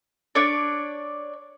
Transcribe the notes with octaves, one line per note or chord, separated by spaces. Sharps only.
D4 C#5 D5